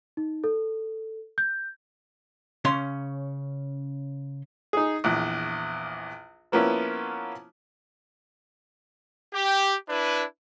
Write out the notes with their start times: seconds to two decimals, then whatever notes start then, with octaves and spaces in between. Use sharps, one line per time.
0.17 D#4
0.44 A4
1.38 G6
2.65 C#3 C#4 C6
4.73 D#4 G#4
5.04 A#1 E2
6.52 F3 A#3 B3 C#4 E4 F4
9.34 G4
9.89 D4 E4 B4